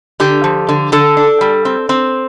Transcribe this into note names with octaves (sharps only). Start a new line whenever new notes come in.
D3 G4
F3
D3
D3 A4
D4
G3
C4
C4